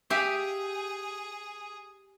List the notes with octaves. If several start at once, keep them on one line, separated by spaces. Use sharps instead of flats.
G4 G#4 E5 F5